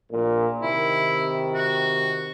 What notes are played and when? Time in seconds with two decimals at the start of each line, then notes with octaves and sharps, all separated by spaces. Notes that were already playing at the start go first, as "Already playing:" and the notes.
0.11 A#1 A#2
0.62 C3 D#3 E4
1.55 F#4